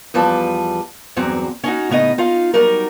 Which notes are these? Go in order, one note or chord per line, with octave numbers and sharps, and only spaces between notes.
E2 F3 G3 B4 A5
E2 G2 F#3 C4
C#4 D#4 F#4
A2 C#3 B3 D#4 D#5
D#4 F4 F5
F#3 G3 D#4 A#4